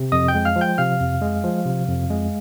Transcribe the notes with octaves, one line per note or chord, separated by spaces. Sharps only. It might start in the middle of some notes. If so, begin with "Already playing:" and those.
Already playing: C3
F2 D#5 D#6
G5 G6
G#3
F5 F6
F3
G5 G6
C3 F5 F6
F2
G#3
F3
C3
F2
G#3